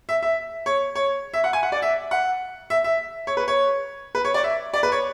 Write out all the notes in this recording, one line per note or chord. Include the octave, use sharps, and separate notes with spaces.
E5
E5
C#5
C#5
E5
F#5
G#5
F#5
D5
E5
F#5
E5
E5
C#5
B4
C#5
B4
C#5
D5
E5
D5
B4
C#5